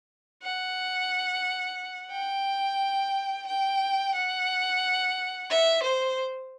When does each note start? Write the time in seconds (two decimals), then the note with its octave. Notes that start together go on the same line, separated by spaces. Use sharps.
0.42 F#5
2.11 G5
3.47 G5
4.15 F#5
5.50 E5
5.83 C5